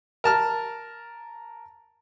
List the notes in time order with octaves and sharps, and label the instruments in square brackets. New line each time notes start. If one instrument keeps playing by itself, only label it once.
[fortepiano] A#4 A5 F6